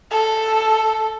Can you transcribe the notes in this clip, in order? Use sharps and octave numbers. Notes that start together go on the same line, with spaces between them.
A4